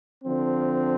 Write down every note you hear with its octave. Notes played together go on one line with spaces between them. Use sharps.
D3 F3 C4